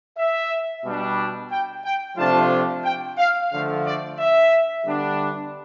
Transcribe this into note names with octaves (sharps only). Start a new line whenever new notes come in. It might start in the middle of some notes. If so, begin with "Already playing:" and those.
E5
B2 G3 D4
G5
G5
C3 F3 A3 D4 F4 A5
G5
F5
D3 F3 A3 F5
D5
E5
D3 G3 B3 D4